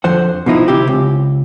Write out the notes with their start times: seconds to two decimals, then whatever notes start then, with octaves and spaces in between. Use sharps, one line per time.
0.04 F2 D3 F3 C5 F#5
0.46 B2 F3 D#4 E4
0.68 D2 C3 E4 G4
0.87 C#2